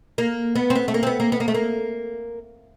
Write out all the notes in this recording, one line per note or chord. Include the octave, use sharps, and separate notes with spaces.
A#3
B3
C4
B3
A3
A#3
C4
B3
A#3
B3
A#3
A3
A#3